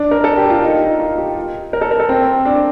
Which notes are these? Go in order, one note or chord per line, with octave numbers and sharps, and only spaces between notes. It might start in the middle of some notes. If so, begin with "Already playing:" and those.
Already playing: D4
A#4
A4
G4
F4
D#4
F4
G4
A#4
A4
A#4
A4
C4
D4